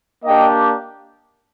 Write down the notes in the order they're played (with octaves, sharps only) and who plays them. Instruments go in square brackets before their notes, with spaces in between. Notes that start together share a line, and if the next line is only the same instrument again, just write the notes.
[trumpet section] A#3 D4 G4 D#5 G5